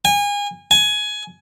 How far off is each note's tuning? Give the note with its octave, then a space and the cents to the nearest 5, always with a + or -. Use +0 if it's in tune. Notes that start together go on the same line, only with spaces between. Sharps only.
G#5 -30
G#5 +15